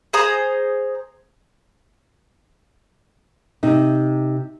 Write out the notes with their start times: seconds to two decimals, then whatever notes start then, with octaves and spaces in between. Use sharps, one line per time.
0.13 G#4 C5 A#5 D#6
3.63 C3 D#4